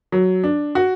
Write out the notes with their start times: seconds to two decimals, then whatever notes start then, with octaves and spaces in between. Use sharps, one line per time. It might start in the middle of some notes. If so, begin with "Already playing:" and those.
0.12 F#3
0.44 D4
0.75 F#4